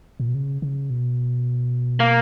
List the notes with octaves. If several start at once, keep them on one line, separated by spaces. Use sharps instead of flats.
A#2
B2
C#3
C#3
B2
A#3